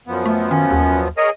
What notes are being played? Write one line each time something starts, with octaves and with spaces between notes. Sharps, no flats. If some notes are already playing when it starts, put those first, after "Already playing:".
F#2 F3 B3
A3
D#3 C#4
D#2
G#4 A#4 C#5 D#5